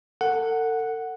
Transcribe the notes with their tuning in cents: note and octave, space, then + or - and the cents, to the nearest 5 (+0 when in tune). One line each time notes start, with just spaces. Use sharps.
A4 +40 F#5 +0